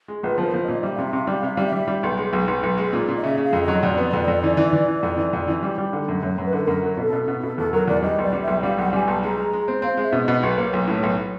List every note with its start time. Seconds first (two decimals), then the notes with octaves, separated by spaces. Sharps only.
0.08 G#3
0.23 A#1 B4
0.38 F3 A#4
0.54 F3
0.63 A#2 D#5
0.83 G3 E5
0.93 F5
0.98 C3 E5
1.13 C3 F5
1.24 G3 E5
1.34 F5
1.43 C3 E5
1.54 G3 F5
1.65 E5
1.72 G3
1.88 G3
2.03 B1
2.17 G#3
2.33 B1
2.48 B1
2.63 B1
2.78 G#3
2.93 A#2
3.08 A#2
3.17 D#5
3.23 C#3 E5
3.38 C#3
3.43 F5
3.53 F2
3.63 D#5
3.68 F#3
3.82 F2 D5
3.98 B3
4.13 F2
4.28 F2
4.43 E3
4.57 E3
4.73 E3
4.88 E3
5.03 F2
5.17 E3
5.33 F2
5.48 E3
5.63 G3
5.78 G3
5.93 D3
6.08 F#2
6.23 F#2 C#5
6.38 F#2
6.43 B4
6.53 D3 A4
6.63 F#2 A#4
6.83 F#3
6.97 B2 A4
7.13 B2
7.28 B2
7.43 B2 A4
7.57 E2 A4
7.73 F#3 A#4
7.88 E2 D5
8.02 G3 D#5
8.18 B1 D5
8.33 G3
8.42 E5
8.47 B1
8.62 G3 F5
8.77 B1 F#5
8.92 G3 G#5
9.07 B1 A5
9.23 G#3 A#5
9.37 G#3
9.53 G#3
9.68 C4
9.82 C4 F5
9.98 G#3
10.03 E5
10.12 B2
10.23 B2 D#5
10.43 B1 C#5
10.58 A#3
10.73 B1
10.87 A2
11.03 B1